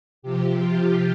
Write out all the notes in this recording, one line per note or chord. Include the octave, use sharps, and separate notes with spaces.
C3 F3 G4
F4